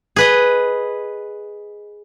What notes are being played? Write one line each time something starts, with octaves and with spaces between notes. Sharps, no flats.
G#4 B4 D#5